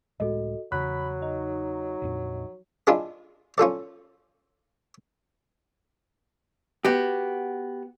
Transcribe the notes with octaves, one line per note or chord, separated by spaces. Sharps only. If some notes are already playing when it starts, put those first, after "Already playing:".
C#2 A2 G#3 F#4 A4 D#5
E2 C#3 F#3 B5 F#6
D#4
A#1 F2 A#2
D4 E4 F4 G#4 D#5
C#4 F4 A4 D5
B3 F#4 G4